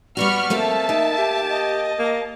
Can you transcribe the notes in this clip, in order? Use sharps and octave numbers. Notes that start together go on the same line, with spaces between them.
G3 B3 F#4 D5 B5 C#6 F6
A3 A#3 C4 E5 A5
A#3 D#4
G4
D#5
A#3